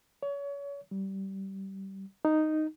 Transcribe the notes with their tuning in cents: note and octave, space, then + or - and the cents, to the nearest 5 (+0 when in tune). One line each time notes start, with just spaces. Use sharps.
C#5 +30
G3 -20
D#4 -5